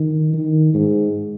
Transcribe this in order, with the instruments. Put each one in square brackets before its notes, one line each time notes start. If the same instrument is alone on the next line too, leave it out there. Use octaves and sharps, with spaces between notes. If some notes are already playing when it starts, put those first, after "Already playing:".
Already playing: [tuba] D#3
D#3
G#2